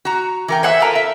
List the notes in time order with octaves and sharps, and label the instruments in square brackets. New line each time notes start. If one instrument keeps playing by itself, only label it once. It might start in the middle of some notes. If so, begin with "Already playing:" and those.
[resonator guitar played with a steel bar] F#4 A#5
E3 A#4 G5
[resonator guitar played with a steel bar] C5 [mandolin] E5 F#5 G#5
[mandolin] F4 A4 A#4
[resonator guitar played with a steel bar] E5